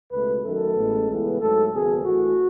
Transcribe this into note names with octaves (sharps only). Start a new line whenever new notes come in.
C#2 B2 A3 B4
F#2 D#3 A3 A4
A1 A2 G#3 B3
C#2 C#3 E3 B3
G#2 F#3 A3 A4
G#1 F#2 C#3 F#3 B3 G#4
A1 A2 E3 A3 F#4